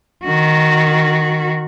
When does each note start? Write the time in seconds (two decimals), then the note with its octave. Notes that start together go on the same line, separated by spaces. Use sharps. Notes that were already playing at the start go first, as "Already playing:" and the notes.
0.24 D#3 F#4